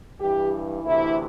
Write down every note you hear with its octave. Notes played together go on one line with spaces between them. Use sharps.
G2 E3 G4
D2 C3 E3 E4